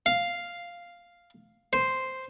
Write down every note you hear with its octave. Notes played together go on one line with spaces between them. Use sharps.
F5
C5